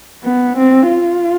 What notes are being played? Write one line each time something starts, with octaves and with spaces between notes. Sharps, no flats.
B3
C4
F4